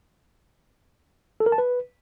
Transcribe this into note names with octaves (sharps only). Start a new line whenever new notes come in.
A4
A#4
A5
B4